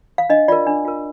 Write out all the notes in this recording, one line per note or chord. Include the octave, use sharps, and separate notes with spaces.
F5
D4 D#5
F4 A#4 D5
D4
F4 A#4